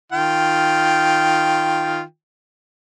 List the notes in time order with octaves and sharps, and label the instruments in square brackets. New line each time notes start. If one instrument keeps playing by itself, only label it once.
[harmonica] D#3 F4 G5